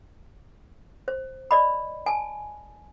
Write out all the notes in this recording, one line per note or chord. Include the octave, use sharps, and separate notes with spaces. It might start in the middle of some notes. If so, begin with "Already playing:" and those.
C5
D5 D#5 B5
G#5 A5